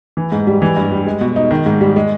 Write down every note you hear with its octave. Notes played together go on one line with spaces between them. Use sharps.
E3
G#2
G3
E3
G2
G3
G#3
B2
D#4
D#3
G#2
G3
G#3